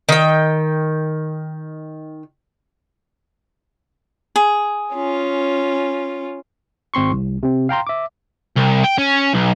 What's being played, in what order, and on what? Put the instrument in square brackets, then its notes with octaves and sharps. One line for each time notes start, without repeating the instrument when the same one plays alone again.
[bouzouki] D#3 G5
[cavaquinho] G#4
[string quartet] C#4 F4
[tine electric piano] G#1 C4 C6 C#6
C2
C3 C4
F5 G5 A#5 C6
E5 D6
[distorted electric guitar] C2
G5
C#4
B1